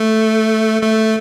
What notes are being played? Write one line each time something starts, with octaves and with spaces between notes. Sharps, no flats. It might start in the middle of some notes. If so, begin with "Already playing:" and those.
Already playing: A3
A3